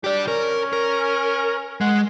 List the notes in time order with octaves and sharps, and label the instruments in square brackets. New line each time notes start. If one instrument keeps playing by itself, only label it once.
[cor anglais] D4 [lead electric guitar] G4 D5
[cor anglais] C#4 [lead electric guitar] A#4
[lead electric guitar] A#4
[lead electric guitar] G#3 [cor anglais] F#5